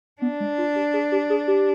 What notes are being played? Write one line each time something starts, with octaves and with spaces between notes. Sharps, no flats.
B3 D4
G#3
F4
G4
G#4
G4
G#4
G4